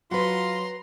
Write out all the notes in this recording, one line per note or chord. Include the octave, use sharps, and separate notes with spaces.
F#3 F4 F#4 B4 A#5 C6